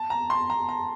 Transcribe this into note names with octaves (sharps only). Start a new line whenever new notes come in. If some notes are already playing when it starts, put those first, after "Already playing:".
Already playing: A5
A#5
C6
A#5
A#5